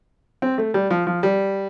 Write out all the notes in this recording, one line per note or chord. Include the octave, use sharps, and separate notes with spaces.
C4
A3
G3
F3
F3
G3